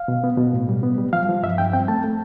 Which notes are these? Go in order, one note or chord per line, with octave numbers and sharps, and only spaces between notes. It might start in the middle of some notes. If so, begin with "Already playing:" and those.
Already playing: F5
B2
B3
B2
A2
G3
B3
G3
F3 F5
F3
G2 E5
G2 G5
C4 G5
A3 A5
A3